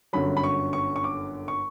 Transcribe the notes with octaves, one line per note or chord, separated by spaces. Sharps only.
G1 F#2 D3 F#3 B5
B5
C#6
C#6
C#6
D6
C#6